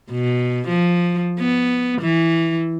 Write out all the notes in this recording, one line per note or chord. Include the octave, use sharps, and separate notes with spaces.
B2
F3
B3
E3